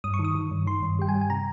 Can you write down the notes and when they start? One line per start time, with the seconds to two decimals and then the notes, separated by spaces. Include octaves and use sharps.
0.04 G2 D#6
0.14 C#6
0.19 D#3
0.24 D#6
0.35 D#3
0.51 G2
0.67 D#3 C6
0.82 G2
0.99 G3 G5
1.09 G#5
1.15 G2
1.21 G#5
1.30 C3 A#5